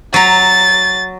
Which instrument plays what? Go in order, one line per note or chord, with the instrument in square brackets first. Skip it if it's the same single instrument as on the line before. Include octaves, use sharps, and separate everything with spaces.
[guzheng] F#3 A#5 [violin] A6